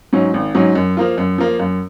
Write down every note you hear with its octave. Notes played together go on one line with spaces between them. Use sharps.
G#2 F#3 C#4
G#1
G#2 F#3 C#4
F#2
F3 A#3 F4
F#2
F3 A#3 F4
F#2